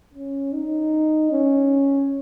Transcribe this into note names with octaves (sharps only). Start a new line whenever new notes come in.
C#4
D#4
C#4